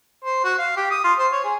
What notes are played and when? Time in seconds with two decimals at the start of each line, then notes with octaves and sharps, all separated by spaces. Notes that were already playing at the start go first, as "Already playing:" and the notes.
0.25 C5
0.44 F#4
0.58 F5
0.76 G4
0.90 D#6
1.04 F4
1.19 C5
1.32 C#5
1.44 G#4